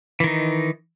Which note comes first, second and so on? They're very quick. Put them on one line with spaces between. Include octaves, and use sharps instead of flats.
E3 D#3 D#4